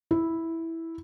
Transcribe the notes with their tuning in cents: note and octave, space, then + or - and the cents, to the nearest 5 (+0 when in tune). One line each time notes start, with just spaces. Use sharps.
E4 -5